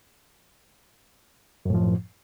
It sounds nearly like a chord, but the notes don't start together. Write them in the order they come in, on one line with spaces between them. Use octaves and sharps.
F#2 A2 F3